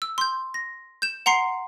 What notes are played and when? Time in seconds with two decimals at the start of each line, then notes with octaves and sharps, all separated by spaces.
0.02 E6
0.18 C6 G6
0.54 A#6
1.02 G6 E7
1.26 F#5 A#5 C6 C7 C#7